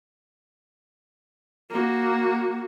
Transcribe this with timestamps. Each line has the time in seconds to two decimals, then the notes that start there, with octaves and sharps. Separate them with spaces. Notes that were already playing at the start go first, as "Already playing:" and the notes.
1.70 A#3 F#4